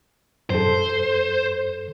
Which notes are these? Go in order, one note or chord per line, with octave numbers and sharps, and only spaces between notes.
F#2 A4 C5